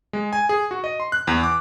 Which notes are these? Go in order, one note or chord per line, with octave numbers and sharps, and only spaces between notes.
G#3
G#5
G#4
F#4
D#5
C6
F#6
E2
D6